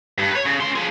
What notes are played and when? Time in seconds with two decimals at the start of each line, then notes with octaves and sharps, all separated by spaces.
0.18 G2
0.32 B4 C#5
0.46 C#3
0.61 C#4 C6
0.76 F3 G#4